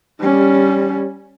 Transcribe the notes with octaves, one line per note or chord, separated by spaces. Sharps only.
G3 C#4